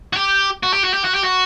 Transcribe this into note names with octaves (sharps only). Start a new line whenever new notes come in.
F#4
G4
F#4
G4
F#4
G4
F#4
G4
F#4